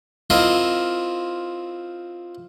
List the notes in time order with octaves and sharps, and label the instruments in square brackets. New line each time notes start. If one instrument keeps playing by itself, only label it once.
[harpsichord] C4 E4 F4 A#4 C5 D#5